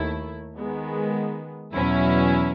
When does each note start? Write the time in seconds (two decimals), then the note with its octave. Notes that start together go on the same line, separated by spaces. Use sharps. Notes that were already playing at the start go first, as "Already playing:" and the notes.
Already playing: D#2 D#3 A3 E4
0.56 D#3 G#3 B3
1.72 E2 B2 F#3 C#4 E4